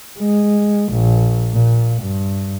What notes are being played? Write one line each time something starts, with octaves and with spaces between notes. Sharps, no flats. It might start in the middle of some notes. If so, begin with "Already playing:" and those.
G#3
A#1
A#2
G2